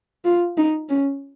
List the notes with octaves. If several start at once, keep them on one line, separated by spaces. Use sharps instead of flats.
F4
D#4
C#4